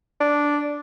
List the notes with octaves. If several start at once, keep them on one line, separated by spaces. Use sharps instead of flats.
D4